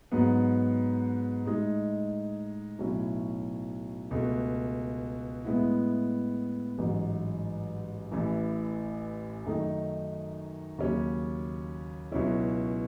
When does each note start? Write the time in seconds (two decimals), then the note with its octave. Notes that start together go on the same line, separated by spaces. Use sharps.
0.12 G#2 F#3 B3
1.45 A2 G#3 D#4
2.78 B1 A2 F#3 C#4 E4
4.11 C#2 B2 A3
5.45 A2 G#3 B3 E4
6.78 A1 G#2 F#3
8.12 A1 A2 E3
9.44 F#2 D#3 A3 D#4
10.78 D#2 C#3 F#3 C#4
12.12 C#2 B2 F#3 C#4 E4